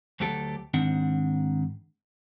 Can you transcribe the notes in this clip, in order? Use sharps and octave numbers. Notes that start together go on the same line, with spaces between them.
D2 F#3 A3 G4 A4
G#2 D#3 C4 D4 F#5